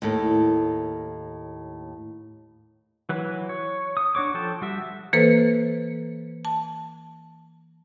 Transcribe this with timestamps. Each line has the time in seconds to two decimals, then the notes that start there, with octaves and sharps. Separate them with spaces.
0.02 D#2 A2 A#3
3.09 E3 F#3 B4
3.49 C#5
3.97 D#6
4.15 D4 F#4 C#5 D6
4.34 F3 A4 G5 A5
4.62 G3 F#4 E5
5.13 E3 A#3 A4 B4 C5
6.45 A5